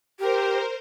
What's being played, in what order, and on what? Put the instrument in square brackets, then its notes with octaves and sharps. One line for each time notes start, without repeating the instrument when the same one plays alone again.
[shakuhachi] G4 [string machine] A#4 C5